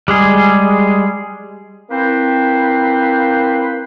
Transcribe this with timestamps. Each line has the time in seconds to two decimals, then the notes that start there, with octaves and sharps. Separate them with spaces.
0.08 G3 G#3 G#4
1.90 A#3 C4 E4 B4 C5